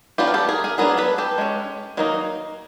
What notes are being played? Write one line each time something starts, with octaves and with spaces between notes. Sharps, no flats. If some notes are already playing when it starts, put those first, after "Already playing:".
F#3 B3 D4 F4 G4
A#4
G4 A4
G#4 A#4
G#4 A#4
F#3 B3 D4 G#4 A#4
A4 B4
G4 A4
G#3 C#4
D#3 F#3 A#3 D#4